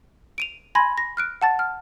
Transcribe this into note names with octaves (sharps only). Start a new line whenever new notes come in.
D7 D#7 F7
G#5 B5 C6 G#6 A#6
A#6
F6 F#6 D7
F#5 A5 A6
F6